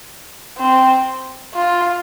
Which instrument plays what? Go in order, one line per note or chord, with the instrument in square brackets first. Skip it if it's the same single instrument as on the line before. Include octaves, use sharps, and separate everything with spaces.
[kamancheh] C4
F4